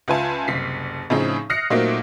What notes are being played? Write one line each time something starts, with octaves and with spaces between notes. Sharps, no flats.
C#2 F4 B4 E5 G#5 A5
F#1 C2 B6 C7
A2 C#3 F3 C4 D#4 G#4
D#6 F6 F#6 A#6 C7 C#7
A#2 F#3 A3 A#3 C4 D#4